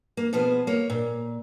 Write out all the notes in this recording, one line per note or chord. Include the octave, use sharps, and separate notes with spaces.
A#3
B2 F3 B3 G#4 C5
A#3 C#5
A#2